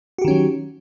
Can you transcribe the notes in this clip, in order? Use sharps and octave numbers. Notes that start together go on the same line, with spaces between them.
D#3 F#3 C#4 F#4 G4